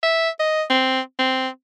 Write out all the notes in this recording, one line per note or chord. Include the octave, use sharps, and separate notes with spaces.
E5
D#5
C4
C4